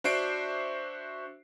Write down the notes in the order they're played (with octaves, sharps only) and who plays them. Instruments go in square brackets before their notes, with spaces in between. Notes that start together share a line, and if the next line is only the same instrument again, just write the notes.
[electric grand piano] D4 F#4 C5 E5 C7 D7